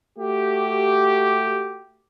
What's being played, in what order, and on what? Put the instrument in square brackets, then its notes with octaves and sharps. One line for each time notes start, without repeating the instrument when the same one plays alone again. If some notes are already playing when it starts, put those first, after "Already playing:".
[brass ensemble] A3 F#4 G4